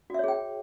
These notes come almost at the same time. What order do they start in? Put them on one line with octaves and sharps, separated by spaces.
F#4 E5 C#5 G#4 G5